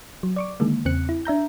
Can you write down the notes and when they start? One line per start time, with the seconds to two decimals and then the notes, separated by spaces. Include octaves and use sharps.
0.23 F#3
0.36 D5 C#6 D6
0.60 D3 D#3 G#3 A#3
0.85 E2 C#3 C4 F#6 C#7
1.09 E4
1.25 D4 E5 A#5 G6